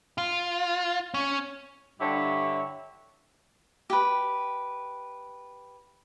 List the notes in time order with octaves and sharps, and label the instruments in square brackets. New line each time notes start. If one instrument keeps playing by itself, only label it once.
[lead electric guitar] F4
C#4
[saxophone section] G2 D3 E4 G4 C#5 E5
[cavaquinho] G4 B4